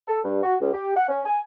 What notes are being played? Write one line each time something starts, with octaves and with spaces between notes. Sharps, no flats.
A4
G2
F#4
C#2
G4
F#5
C#4
G#5